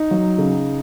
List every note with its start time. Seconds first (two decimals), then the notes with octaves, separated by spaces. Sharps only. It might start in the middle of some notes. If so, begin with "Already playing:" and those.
Already playing: D#4
0.11 F#3
0.38 C#3